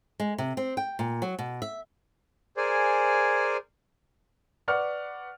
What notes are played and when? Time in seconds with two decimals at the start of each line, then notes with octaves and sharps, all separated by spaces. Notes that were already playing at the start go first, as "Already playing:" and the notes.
0.20 G#3
0.38 C3
0.57 C4
0.77 G5
0.99 A#2
1.22 F#3
1.39 B2
1.62 E5
2.57 G#4 A#4 C5 D5 G#5
4.68 B4 D5 F#5 C#6 F6